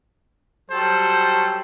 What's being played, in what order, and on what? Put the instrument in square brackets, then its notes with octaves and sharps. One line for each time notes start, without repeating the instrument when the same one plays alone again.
[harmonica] F#3 G3 A4 [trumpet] C5